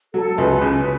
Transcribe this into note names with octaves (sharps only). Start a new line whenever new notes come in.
F#3 A4
C#2 B4
C#3